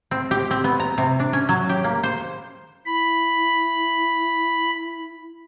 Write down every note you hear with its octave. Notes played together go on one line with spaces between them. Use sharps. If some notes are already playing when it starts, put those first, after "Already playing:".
C4
G4
C4
B3
A#5
C3
D4
C#4
F#3
G4
A#3
C5
E4 B5